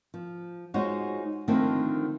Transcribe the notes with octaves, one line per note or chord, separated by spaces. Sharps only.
F3
G#3 D#4 F4 F#4 C5 C#5
D3 D#3 F3 A3 A#3 C4